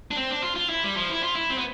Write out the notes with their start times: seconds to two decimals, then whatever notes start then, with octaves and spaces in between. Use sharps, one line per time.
0.11 D4
0.16 C4
0.31 D4
0.43 F4
0.56 F4
0.69 E4
0.84 G3
0.97 F3
1.10 E4
1.23 F4
1.36 E4
1.50 C4
1.58 B3